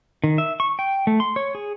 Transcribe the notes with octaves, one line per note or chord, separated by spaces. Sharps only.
D#3
E5
C#6
G5
A3
C6
C#5
G#4